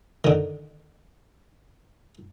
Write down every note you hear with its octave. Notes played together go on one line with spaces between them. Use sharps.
D3 D#3